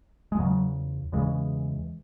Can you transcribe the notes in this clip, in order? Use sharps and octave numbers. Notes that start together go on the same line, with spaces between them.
G#3
E2 C#3 F#3
E2 C#3 E3 G#3